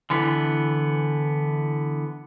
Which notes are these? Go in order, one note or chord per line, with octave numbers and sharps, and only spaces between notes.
D3 E3 B3